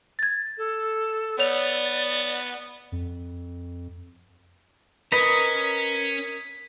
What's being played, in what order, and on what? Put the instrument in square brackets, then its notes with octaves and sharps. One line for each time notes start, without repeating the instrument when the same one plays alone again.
[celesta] G#6 A6
[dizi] A4
[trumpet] B3 [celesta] C#5 F7 [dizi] D5
[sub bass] F2
[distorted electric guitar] C#4 [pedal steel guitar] A#4 D#5 A#5 [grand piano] B4 [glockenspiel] B6